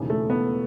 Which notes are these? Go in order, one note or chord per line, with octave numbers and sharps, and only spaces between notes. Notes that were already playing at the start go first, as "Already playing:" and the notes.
Already playing: E1 D#2 C#3 E3
A3
B3